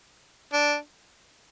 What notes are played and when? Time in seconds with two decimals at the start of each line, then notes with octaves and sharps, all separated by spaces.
0.53 D4